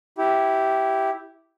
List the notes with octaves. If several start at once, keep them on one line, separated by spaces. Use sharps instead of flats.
E4 G4